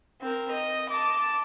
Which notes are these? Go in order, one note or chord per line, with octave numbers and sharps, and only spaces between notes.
C4 A#4
D#5
A5 D6